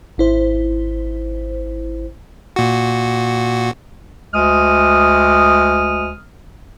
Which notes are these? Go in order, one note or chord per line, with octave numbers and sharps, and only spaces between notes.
G#1 E4 C5
A#2 F#4
D2 G#3 D#6 F6